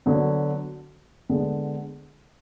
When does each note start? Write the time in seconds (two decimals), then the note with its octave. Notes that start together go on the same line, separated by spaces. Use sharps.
0.06 D3 F#3 B3
1.29 D3 G#3 B3